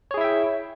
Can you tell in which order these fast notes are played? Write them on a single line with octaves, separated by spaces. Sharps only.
C#5 G#4 E4 E5 G5